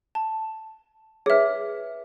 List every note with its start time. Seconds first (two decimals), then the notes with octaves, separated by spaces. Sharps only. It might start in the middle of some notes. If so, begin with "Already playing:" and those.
0.15 A5
1.26 G#4 B4 C#5 E5